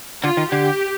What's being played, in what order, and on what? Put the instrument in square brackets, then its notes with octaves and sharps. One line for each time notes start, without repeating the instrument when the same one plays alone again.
[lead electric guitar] D3 [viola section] F4
[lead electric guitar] D#3
[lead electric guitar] D3 [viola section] G4